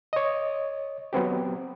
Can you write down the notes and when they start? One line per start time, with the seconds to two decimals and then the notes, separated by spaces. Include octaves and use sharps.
0.13 C#5 D#5
1.13 F#3 B3 C4 G4